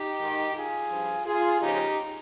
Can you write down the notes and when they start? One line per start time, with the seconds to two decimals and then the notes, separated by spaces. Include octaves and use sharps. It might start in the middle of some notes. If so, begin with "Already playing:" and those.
Already playing: D#4 G4
0.19 G#2 D#3
0.54 F4 G#4
0.90 G2 F3
1.24 F4 G#4
1.60 D#2 C#3 F3 D#4 G4